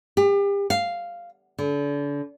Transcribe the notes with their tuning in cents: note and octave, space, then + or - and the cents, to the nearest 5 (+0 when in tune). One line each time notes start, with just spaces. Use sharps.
G4 +35
F5 -5
D3 -35